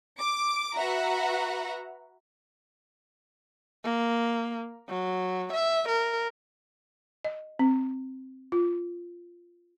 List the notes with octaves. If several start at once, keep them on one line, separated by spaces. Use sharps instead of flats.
D6
F#4 B4 E5 F#5 A#5
A#3
F#3
E5
A#4
D#5
C4
F4